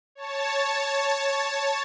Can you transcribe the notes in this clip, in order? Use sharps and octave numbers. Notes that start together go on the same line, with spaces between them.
C#5 A5